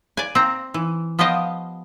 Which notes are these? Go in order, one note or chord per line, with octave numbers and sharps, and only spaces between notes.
D5 G#5
C4 A#5
E3
F3 B3 G4 C5 D#5 F5